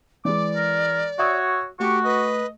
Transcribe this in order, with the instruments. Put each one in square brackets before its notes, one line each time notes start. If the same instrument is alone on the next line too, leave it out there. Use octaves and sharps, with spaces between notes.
[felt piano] E3 G#3 [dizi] D5 [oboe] D6
[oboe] A#4
[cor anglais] F#4 [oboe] C#5 [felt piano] E5 D#6 E6
[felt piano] A3 [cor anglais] F#4 [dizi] G4 [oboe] C#6
[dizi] B4 [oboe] D#5